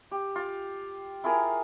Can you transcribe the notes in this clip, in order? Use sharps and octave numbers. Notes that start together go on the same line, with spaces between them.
G4
F4
E4 F4 G#4 A#4